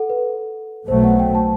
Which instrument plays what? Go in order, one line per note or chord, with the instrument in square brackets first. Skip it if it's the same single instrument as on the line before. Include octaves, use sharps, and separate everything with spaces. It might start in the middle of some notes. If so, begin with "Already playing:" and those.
Already playing: [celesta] A4 F#5
B4
[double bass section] B1 B2 F#3 A3 [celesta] C5
[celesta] F#5
G5
A5